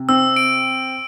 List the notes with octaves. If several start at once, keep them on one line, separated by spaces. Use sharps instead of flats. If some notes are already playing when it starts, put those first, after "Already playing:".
Already playing: C3
C4 E6
D7